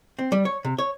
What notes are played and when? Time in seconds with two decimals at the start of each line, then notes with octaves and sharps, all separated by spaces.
0.19 C4
0.32 G3
0.45 C#5
0.65 C3
0.78 C#5